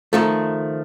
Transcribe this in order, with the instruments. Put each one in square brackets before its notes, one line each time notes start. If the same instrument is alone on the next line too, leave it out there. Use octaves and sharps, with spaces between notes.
[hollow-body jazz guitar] D#3 F3 A3